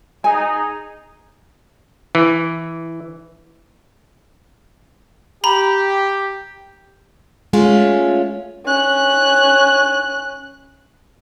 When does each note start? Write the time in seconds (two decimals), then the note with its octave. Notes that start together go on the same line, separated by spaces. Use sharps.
0.24 D#4 G#4 G#5
2.15 E3
5.44 G4 A#5 B5
7.53 G#3 A3 C#4 F4
8.65 C#4 F#6